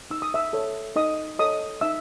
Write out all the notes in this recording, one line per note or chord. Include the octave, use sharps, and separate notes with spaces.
D#4 E6
D#6
E5 E6
A4 C#5
D#4 D#5 D#6
A4 C#5 D#5 D#6
D#4 E5 E6